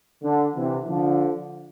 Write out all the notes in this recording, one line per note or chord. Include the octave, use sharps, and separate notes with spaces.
D3
C3 E3
D3 F3